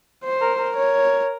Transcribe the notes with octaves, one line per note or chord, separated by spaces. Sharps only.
C5
A#4
A#4
C#5